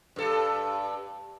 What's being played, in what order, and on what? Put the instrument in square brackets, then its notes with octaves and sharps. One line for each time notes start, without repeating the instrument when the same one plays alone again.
[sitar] G2 A4